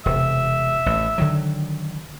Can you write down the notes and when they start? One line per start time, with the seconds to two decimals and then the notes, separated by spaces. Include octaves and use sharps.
0.06 E1 C3 E5
0.86 A1
1.18 D3 D#3 F#3